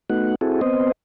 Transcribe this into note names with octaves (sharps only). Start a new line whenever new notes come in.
A3 B3 D#4 F#4 F#5
C4 E4 F#4 G#4 A4
B3 C4 C5 D#5